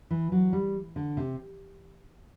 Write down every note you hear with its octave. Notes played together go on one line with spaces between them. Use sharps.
E3
F#3
G3
D3
C3